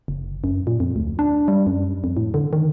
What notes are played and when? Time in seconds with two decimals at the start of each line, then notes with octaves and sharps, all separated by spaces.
0.08 F#1
0.44 F#2
0.67 A#2
0.80 F2
0.96 D2
1.19 D4
1.48 G3
1.67 F#2
2.04 F2
2.17 A2
2.34 D3
2.53 D#3